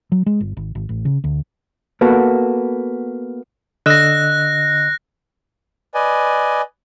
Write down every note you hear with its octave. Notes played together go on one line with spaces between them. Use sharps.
F#3
G#3
G1
G#1
G#1
A1
C#3
D2
A#3 B3 F#4 A4
D3 D#5 E6 F#6 A#6
B4 D5 D#5 G#5